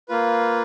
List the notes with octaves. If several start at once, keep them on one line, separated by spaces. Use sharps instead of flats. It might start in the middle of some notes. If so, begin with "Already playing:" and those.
A#3 F4 B4